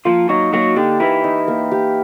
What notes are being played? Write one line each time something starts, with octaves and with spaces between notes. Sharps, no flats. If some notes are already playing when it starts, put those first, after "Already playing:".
F3 A#3 F4
F#3 D#4 F#4
F#3 A#3 F#4
D3 D4 G4
E3 A#3 E4
D#4
A#3
G4